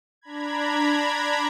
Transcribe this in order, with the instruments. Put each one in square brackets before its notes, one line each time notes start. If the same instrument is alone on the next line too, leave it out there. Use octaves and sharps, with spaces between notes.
[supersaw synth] D4 A#5 B5 G#6